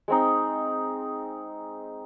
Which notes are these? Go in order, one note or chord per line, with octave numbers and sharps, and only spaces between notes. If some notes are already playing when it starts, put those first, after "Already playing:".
G#3 C4 D#4